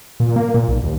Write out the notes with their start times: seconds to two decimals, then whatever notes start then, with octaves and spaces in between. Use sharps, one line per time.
0.20 A#2
0.36 A#3
0.54 A#2
0.68 B1
0.83 D#2